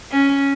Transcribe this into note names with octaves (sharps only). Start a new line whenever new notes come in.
C#4